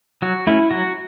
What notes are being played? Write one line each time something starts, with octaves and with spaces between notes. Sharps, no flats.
F#3 F#4
A3 C#4 E4
F#3 F#4